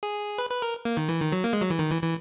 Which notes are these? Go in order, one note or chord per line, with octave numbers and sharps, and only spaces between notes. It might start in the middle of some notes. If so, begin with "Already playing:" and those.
G#4
B4
B4
A#4
A#3
D#3
E3
D#3
F#3
A#3
G#3
F#3
E3
D#3
E3
E3